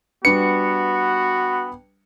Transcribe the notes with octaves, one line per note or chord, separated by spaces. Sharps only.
G3 B3 D4 F#4 B4 C#7